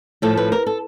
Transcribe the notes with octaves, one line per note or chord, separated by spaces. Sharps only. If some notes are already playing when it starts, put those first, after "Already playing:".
A2 F3 A3 A4
B4
A#4
A4